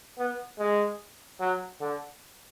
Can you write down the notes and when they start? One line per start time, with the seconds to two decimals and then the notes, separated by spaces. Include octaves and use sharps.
0.19 B3
0.59 G#3
1.40 F#3
1.81 D3